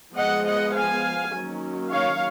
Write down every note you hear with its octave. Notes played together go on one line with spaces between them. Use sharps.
F3 G#3 B3 D#5 F#5
D#5 F#5
F5 G#5
D#3 F#3 A#3 C#4
C#5 F5